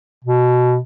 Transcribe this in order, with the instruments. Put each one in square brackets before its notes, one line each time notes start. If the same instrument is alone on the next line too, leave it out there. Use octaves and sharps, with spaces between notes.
[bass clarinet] B2